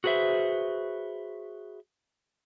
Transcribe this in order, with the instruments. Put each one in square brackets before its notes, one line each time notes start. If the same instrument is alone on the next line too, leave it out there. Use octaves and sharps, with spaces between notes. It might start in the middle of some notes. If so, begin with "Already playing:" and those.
[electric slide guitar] F#4 G#4 B4 C5 E5